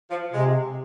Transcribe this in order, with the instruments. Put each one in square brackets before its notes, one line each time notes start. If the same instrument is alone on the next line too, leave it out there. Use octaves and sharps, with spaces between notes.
[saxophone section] F3
[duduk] C3 [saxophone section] G#3